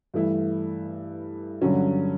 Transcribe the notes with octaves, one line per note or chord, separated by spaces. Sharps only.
G2 E3 A3 E4
G2 D3 F#3 C#4